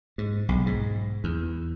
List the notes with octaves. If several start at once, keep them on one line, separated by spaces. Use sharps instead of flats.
G#2
B1
G#2
E2